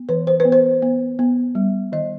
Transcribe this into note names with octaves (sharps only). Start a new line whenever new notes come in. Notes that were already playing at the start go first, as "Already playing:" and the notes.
Already playing: B3
E3 B4
C5
B4
B3
C5
B3
B3
G3
D#3 D#5